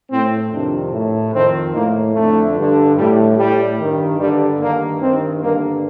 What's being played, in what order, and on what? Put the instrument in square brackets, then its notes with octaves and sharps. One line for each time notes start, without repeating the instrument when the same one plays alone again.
[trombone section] A2 C4
F2 C3 D#3 D4
A2
F2 D#3 C4
A2 A#3
F2 D3 A3
G2 D3
A2 G3
A2 G3
G2 D#3
G2 D3 G3
G2 D#3 A#3
G2 D#3 C4
G2 D3 A#3